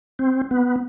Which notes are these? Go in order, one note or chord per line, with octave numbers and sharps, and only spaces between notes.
C4
B3